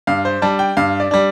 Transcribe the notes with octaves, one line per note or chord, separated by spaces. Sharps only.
G2 F5
C5
G3 D4 A5
G5
G2 F5
D5
G3 D4